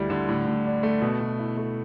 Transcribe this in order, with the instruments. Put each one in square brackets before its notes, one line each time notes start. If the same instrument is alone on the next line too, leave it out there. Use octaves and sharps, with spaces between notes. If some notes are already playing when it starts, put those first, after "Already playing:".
Already playing: [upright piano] D2 G3 E4
D3
A2
A2
D4
A3
B2
B2
E4
A3